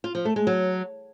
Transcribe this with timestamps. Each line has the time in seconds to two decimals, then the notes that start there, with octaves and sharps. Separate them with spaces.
0.04 F4
0.15 F3
0.25 A3
0.36 G#3
0.47 F#3